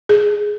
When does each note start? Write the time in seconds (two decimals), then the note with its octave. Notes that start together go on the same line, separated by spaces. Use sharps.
0.09 G#4